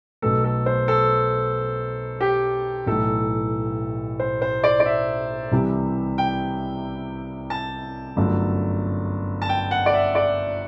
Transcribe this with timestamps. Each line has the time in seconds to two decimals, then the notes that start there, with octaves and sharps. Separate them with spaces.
0.22 B1 B2 A3 A4
0.44 A4
0.66 C5
0.88 A4
2.21 G4
2.87 B1 A2 E3 A3 A4
4.20 C5
4.42 C5
4.64 D5
4.80 D5
4.85 E5
5.52 C2 C3 E3 G3
6.18 G5
7.50 A5
8.16 G1 F#2 F#3 A3
9.42 A5
9.49 G5
9.71 F#5
9.86 D5
9.93 E5
10.15 D5